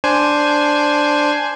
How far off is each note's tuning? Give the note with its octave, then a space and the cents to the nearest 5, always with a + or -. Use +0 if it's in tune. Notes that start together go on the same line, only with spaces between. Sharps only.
D4 +0 C5 +0 G#5 +5